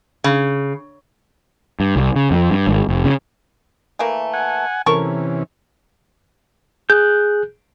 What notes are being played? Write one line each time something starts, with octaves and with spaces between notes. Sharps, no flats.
C#3
G2
C2
C#3
F2
G2
G#1
F1
C#3
E3 A3 A#3
F#5 G#5
C3 E3 C#4 A4 A#4 C#6
G#4 F#6 G6